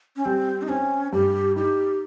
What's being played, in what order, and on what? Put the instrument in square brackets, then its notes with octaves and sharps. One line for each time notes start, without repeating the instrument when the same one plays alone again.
[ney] C#4
[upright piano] G3 [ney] C4
[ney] D#4
[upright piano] C4 [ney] C#4
[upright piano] G2 [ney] G4
[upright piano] D#4 [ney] G4